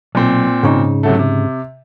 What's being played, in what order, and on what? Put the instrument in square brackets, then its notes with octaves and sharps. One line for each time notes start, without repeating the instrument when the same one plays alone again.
[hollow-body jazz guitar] B1 [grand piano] A#2 C4
[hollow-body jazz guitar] G#2 C#3 D#4
[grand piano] C3 F#3 A3
C3